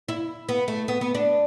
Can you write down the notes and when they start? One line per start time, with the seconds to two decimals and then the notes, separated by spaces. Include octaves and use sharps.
0.08 E4
0.49 B3
0.68 A3
0.88 B3
1.01 B3
1.15 D4